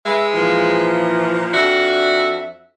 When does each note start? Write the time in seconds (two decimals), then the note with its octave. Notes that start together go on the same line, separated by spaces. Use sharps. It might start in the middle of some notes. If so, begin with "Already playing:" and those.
0.06 G#3 B4 E5
0.34 A#2 E3 F3
1.54 F2 D4 F#4 E5